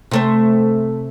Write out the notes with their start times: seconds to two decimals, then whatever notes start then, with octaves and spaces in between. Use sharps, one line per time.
0.11 C3 A3 C5